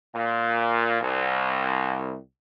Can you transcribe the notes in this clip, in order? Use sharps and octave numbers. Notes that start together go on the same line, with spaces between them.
A#2
C2